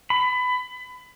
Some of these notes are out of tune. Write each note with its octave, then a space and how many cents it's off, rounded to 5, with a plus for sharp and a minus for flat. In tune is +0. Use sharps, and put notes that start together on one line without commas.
B5 +25